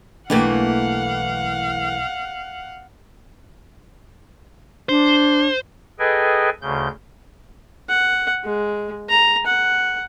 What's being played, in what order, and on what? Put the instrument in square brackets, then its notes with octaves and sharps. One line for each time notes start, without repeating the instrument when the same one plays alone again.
[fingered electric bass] B1 D4 [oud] E3 A3 A#3 [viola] F5 F#5
[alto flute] D4 [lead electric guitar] C5
[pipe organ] G#4 A4 B4 D#5 G5 G#5
D2 C#3 G6
[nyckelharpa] F#5
G#3
A#5
F#5